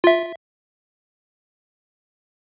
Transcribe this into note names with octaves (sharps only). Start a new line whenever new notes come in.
F4 E5